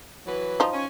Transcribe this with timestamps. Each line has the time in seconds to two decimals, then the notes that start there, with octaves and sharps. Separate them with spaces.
0.27 E3 F#3 B4
0.60 F3 D#4
0.73 C#4